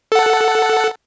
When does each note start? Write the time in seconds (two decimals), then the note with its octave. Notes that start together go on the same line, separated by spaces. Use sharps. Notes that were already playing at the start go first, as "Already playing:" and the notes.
0.12 A4 F#5